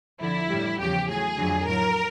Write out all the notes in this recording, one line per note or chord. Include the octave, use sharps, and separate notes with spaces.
F2 D3 F3 E4
A2 E3 G3
E2 C#3 F3 G4
A2 F#3 G#4
F2 D3 F#3
A2 F#3 A#4